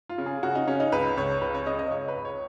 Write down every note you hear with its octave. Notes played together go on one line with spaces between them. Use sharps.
F4
C#3
G#4
C#3 F#4
D#4
C#3 C#4
D#4
C#2 B4
C#2 C#5
C#3 B4
C#5
C#3 D#5
D#5
C#2 C#5
B4
C#2
C#5